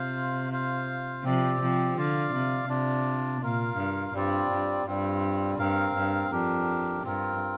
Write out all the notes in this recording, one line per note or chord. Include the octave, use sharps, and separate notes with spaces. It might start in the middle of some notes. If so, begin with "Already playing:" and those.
Already playing: C3 F4 C5 F5
F4 C5 F5
C3 F3 C4 G4 D5
C3 F3
D3 F4 D5 F5
C3
C3 D4 F4 D5
A#2 F4 A#4 F5
G2
G2 G3 C4 F4 D5
G2
G2 G3 C4 F4
G2 C4 A#4 F5
G2
F2 D4 G4 A#4
G2 C4 F4 A#4